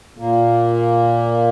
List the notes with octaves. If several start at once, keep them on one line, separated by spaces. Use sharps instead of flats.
A#2 A#3